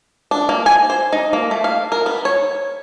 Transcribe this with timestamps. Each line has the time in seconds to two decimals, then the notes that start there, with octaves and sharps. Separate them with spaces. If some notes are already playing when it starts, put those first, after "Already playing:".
0.31 D4
0.49 A#3
0.66 G#5
0.90 C5
1.13 D#4
1.33 A#3
1.51 A3
1.64 F5
1.92 A#4
2.06 B3
2.25 C#5